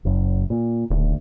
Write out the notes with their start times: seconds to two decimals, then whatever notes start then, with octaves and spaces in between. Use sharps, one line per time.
0.05 F#1 F#2
0.50 A#2
0.90 D#1 D2